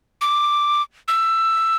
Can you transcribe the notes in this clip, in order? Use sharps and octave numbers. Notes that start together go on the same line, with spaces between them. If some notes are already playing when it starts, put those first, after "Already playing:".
D6
E6